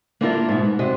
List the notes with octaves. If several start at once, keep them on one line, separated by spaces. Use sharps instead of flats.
A#3 B3 D4 E4 F4 A#4
G#2 B2
B3
C3 F#4 C5 D#5